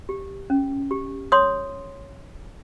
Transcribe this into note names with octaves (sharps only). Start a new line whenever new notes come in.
G4
C#4
G4
C#5 C6 D#6